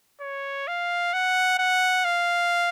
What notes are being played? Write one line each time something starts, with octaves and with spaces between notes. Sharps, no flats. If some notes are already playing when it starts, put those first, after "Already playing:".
C#5
F5
F#5
F#5
F5